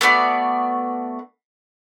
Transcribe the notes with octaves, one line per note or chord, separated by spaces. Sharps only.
A3 B3 F#4 D5